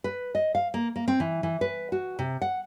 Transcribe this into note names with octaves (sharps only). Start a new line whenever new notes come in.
B4
D#5
F5
A#3
A#3
C4
E3
E3
B4
F#4
C3
F#5